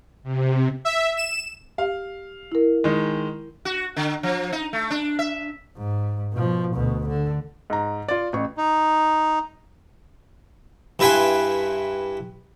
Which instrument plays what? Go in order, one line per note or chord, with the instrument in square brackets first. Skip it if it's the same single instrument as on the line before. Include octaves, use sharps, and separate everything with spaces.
[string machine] C3
[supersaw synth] E5
E7
[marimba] G4 [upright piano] F5
[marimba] E4 A#4
[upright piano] D#3 G#3
[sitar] F#4
D3
F3
D#4
A3
D4
E5
[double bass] G#2
B2 F3
D2 B2
D3
[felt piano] G#2 A#5
F4 D5
A1 C#6
[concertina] D#4
[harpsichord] G2 E4 B4 G5 G#5 C6